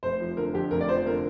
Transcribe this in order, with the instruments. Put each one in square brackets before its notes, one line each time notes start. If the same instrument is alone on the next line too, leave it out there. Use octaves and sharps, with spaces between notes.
[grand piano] F1 C5
F3
D3 A#4
F2 G4
F1 A#4
D5
F3 C5
D3 A#4